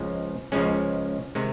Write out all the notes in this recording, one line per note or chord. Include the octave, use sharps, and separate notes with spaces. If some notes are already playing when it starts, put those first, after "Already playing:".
Already playing: C#2 C#3 F3 G#3 C#4
C#2 C#3 F3 G#3 C#4
C3 D#3 G#3